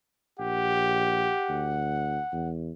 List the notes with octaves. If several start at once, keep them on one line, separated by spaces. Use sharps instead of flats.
A#1 G4 F#5
D2
E2